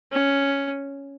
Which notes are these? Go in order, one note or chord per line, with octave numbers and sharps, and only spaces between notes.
C#4